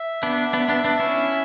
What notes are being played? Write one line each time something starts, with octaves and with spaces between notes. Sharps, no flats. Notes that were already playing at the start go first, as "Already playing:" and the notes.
Already playing: E5
B3 D4
B3 D4
B3 D4
B3 D4
C#4 E4